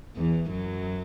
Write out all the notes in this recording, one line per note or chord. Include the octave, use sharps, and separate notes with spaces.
E2 E3
F#2 F#3